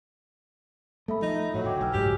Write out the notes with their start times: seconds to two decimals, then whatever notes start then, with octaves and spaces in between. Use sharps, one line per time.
1.08 A3 A4 E5 B5
1.22 F3 D#4
1.54 A2 F#3
1.66 D2 G5 D6 G#6
1.81 B1 G#5 E6 F6
1.93 F#1 G#2 F#3 F#4 G4